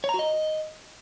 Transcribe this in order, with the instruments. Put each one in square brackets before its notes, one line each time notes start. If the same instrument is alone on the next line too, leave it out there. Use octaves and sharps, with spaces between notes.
[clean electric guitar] C#5
A#5
F#4
D#5